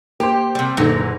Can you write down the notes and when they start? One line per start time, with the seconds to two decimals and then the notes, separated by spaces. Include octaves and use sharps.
0.20 A#3 G4 C5
0.55 C3 G3
0.77 F#1 A#2 D3 E3 D#4